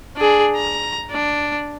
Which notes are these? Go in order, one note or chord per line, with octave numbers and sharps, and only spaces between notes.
D4 G#4
A#5
D4